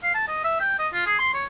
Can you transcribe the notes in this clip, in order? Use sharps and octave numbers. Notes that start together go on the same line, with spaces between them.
F5
A5
D#5
E5
G5
D#5
F4
G#4
C6
C#5